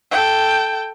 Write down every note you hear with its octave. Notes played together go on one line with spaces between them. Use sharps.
A4 G5